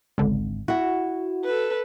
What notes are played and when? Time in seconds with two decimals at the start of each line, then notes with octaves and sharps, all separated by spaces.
0.18 G#1 C#2 D3
0.68 E4 F#4 F#5
1.45 A4 B4